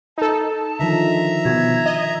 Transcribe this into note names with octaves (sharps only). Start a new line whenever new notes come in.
D#4 A4 A5
D3 D#3 F3 E5 A#5
B2 G#6
D#5